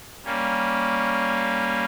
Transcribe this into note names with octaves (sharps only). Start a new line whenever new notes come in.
G3 A#3 C#4